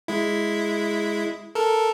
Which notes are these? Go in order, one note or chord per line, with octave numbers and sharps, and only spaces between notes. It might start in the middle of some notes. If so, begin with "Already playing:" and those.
G#3 E4
A4 A#4